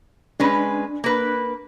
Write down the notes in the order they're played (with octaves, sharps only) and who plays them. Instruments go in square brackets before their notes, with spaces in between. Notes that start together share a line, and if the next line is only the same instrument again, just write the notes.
[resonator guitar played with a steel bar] G#3 C#4 B4 [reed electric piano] D4
[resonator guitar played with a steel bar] A#3 B4